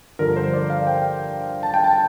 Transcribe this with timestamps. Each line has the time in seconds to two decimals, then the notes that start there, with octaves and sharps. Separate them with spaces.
0.19 G2 D3 F3 A#4
0.37 C5
0.53 D5
0.70 F5
0.87 G5
1.63 A5
1.74 G5
1.84 A5